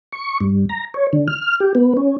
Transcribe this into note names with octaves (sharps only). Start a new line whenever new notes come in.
C#6
G2
A#5
C#5
D3
F6
G4
B3
C#4